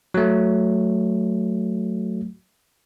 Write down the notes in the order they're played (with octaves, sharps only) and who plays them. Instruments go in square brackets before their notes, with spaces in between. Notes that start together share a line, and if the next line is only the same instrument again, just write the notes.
[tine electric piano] F#3 A3